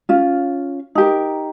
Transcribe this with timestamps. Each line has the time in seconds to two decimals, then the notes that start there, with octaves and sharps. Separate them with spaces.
0.09 C#4 F4
0.95 D#4 G4 A#4